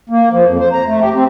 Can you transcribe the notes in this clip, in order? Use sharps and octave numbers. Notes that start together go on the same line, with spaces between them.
A#3
F3
F2
C5
A#5
A3
G4
C4